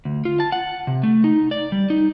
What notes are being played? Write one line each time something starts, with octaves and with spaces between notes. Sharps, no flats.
D2
F4
A5
F#5
C3
A3
D#4
D5
G3
D#4